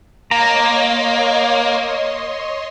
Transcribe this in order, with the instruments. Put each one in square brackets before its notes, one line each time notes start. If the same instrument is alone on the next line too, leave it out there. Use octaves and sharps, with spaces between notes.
[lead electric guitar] A#3 [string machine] C#5 D#5 C6 [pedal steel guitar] A#5